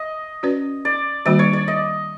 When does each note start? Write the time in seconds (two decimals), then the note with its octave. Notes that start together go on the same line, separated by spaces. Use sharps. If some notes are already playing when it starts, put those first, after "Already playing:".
Already playing: D#5
0.43 C#4 F#4 B4 D5
0.85 D5
1.25 D#3 G3 A#3 D4 F#4 D5
1.39 C#5
1.53 D5
1.68 D#5